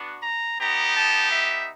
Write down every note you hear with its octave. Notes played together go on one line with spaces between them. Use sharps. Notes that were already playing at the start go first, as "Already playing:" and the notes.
Already playing: B3 D4 F#4
A#5
B3 D#4 G4 A#5
A5
E5